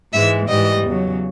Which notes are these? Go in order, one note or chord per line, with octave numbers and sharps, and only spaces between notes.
G#2 E3 G#3 E5
G#2 E3 G3 D#5
E2 C#3 F#3